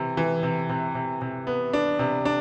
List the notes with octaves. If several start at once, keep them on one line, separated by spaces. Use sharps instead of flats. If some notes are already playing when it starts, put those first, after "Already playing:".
Already playing: C3 E3
E3
C3
C3
C3
C3
B3
D4
C3
D4